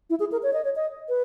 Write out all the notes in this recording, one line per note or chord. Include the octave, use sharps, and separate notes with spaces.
E4
G#4
A#4
C#5
D#5
C#5
D#5
B4